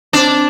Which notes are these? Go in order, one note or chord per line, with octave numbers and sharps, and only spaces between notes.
C4 D4